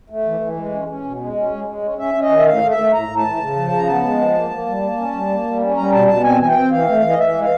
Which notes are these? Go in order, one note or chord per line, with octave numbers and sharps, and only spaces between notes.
A3
E3
E3
G#3
C#4
C#4
B2
G#3
C#4
G#3
G#3
C#4
C#4 E5
C#4
D#5
D#3
E5
A2 F5
A3
E5
A3
A2 A#5
A2
A5
E3
C#3
F3
C#3 A#5
B3 A5
G#3
F3
A#3
A#3
G3
A#3
C#4
G3
A#3
G3
C#4
G3 A#5
B2 A5
B2 A5
C4 G#5
E3 G#5
G5
C4
E3 F5
A3
E3
D#5
E3 E5
G#3
F5